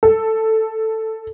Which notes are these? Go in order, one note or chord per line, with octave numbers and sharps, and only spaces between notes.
A4